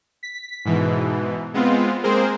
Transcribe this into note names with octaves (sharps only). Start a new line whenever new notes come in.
B6
G#2 B2 E3
G#3 B3 C4 F4
G#3 A#3 C4 G#4 A#4 C5